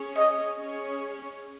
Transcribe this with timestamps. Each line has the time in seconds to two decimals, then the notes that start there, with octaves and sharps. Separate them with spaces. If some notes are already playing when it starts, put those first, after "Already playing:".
Already playing: C#4 G#4 C#5
0.17 D#5
0.58 C#4 G#4 C#5